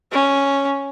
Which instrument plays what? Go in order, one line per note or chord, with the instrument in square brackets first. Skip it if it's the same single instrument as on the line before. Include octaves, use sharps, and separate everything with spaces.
[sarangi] C#4